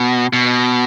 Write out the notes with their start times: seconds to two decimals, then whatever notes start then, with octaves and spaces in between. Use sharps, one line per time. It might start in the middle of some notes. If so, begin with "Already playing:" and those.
Already playing: B2
0.33 B2